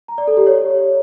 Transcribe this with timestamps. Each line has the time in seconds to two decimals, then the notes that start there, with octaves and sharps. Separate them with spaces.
0.08 A#5
0.18 D5
0.28 A4
0.37 G4
0.47 C#5